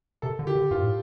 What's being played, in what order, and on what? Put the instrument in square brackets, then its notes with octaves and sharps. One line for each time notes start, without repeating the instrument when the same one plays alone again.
[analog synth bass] C3 [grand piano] A4
[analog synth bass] D3
[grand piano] G4
[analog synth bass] D3
[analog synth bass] G2 [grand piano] F4
[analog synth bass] A2